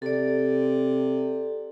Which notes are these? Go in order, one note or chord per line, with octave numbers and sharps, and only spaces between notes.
C3 A4 D5